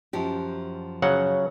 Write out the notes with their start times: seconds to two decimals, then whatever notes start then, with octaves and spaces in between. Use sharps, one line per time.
0.13 F#2 F3 G4
1.02 C#3 F#3 F#5